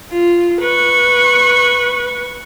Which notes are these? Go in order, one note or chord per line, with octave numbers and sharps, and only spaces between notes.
F4
B4 C#6